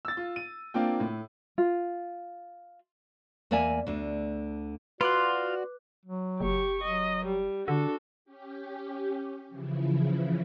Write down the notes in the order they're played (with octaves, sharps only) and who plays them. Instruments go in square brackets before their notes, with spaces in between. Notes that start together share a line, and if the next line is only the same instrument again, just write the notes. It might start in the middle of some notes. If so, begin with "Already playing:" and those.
[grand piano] E6 A6
F4
D#7
A#3 C4 D4 F4 G5
A2
[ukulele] F4
[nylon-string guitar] E2 A#3 A#4 D5 E5 G#5
D2 D3
[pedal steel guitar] F4 [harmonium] F#4 D5 [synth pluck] B4 D6 F#6 [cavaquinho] C6
[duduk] F#3
[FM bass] F#1 [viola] G4 C#6
[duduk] F#3 [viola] D#5
[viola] G3
[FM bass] D3 [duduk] D4 [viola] F#4 A4
[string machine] C#4 G4
C#3 E3 F3 E4